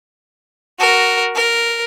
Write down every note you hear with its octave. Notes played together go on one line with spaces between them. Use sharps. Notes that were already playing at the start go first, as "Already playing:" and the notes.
F#4 A#4
A#4